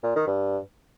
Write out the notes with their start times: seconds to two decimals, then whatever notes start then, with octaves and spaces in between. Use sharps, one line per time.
0.03 A#2
0.15 D#3
0.27 G2